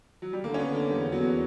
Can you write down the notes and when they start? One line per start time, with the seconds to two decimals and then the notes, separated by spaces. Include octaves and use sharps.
0.22 F#3
0.33 G3
0.44 D3 A#3
0.54 C#4
0.59 B3
0.66 D3
0.74 A#3
0.90 E2 G3
1.12 E2 F#3